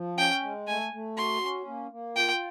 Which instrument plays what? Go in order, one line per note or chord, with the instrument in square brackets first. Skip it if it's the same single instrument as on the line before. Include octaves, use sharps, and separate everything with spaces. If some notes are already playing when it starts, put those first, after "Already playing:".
Already playing: [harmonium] F3
[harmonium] C#4 [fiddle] G5
[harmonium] G#3
[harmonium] A3 [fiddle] G#5
[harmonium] A3
[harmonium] F#4 [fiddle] C6
[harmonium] C#4
A#3
A#3
[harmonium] F4 [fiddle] G5